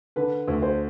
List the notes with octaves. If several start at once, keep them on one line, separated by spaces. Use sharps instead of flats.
D3 B4
D2
C5